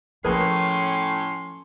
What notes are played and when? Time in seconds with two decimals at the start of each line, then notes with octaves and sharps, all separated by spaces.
0.25 A2 F3 A#3 C#4 G#4 B4 C6